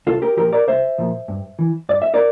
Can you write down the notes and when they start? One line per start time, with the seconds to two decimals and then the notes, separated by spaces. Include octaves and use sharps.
0.07 C2 F4 A4
0.22 G4 A#4
0.37 A#2 F3 G4 A#4
0.52 A#4 D5
0.67 C2 C5 E5
0.98 A#2 F3
1.28 G2
1.59 E3
1.89 G2 D5
2.02 E5
2.14 A#4 D5